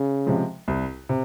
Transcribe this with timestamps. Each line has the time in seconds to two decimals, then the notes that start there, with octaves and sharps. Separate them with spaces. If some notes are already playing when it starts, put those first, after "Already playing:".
Already playing: C#3
0.27 C3 F3 G#3
0.68 C2
1.09 C3